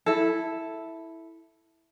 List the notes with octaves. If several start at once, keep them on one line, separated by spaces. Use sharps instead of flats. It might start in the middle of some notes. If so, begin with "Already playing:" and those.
E4 A4